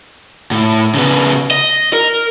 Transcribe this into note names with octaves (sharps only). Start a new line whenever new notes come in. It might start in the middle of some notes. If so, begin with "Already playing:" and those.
A2
C#3 B3
D#5
A#4